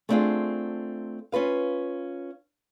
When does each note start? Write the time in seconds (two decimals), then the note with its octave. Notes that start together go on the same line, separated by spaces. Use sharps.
0.09 A3 B3 C4 D4 F4 G#4
1.32 C#4 F4 B4 F5